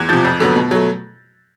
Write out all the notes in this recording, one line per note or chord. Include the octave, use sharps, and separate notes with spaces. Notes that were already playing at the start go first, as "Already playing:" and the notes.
Already playing: E2 F#6 G#6
C3 F3 G6 A6
F2
D3 F#3 B3
B2
F#3 A3